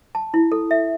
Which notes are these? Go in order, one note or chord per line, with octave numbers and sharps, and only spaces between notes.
A5
E4
A4
E5